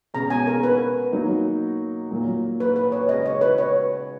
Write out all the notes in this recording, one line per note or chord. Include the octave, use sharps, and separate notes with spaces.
B2 G#3 C#4 G#4 A#5
G#5
A#4
B4
F#3 A#3 D#4 F#4
A#2 F#3 A#3
B4
B4
C#5
C#3 G#3 C#4 D#5
C#5
B4
C#5